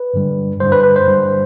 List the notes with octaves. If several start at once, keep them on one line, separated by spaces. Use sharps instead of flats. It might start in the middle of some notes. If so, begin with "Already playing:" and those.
Already playing: B4
G2 D3 G3
G2 D3 G3 C5
B4
B4
C5
G2 D3 G3